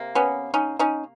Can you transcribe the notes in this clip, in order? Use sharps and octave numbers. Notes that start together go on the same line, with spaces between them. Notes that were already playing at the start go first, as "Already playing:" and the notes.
Already playing: C3 A#3
B3 C#4
C#4 D#4
C#4 D#4